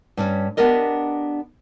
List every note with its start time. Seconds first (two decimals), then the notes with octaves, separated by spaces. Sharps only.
0.17 G2 G3 C#4
0.57 B3 D4 G4 A#4 D#5